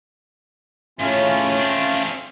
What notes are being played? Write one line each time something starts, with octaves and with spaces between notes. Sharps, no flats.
A2 C#3 A3 C#4 F4
C4 D4